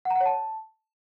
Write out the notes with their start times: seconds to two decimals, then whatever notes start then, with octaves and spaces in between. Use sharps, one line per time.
0.05 F#5
0.10 A#5
0.16 F#5
0.21 C#5
0.26 A5